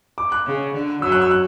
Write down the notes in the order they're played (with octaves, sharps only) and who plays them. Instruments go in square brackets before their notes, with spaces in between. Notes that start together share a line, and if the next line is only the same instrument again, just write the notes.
[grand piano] D6
F#6
[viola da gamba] C#3
D3
[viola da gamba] F#2 F#3 [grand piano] E6
[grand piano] F#6
E6
F#6